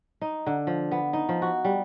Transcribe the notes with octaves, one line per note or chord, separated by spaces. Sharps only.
D#4
D3
F3
B3
D#4
F3
F#4
G3